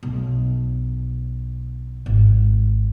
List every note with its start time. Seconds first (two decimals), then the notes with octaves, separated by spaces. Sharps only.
0.03 B1
2.06 G#1